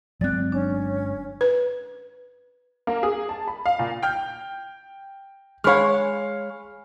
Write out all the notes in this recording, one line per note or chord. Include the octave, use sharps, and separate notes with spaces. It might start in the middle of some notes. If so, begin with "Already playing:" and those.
G1 F#3 G#3 C4 D5 F#6 A6
C#4 D4
B4
A#3
G#4
A5
B5
F5
A#2
G5 F6 G6
G#3 C#5 F5 B5 F6